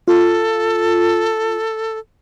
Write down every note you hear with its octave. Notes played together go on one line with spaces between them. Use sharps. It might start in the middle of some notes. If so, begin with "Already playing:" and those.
F4 A4